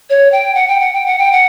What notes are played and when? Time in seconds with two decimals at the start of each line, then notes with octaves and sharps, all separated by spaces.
0.10 C#5
0.32 G5
0.55 F#5
0.68 G5
0.80 F#5
0.93 G5
1.06 F#5
1.19 G5
1.32 F#5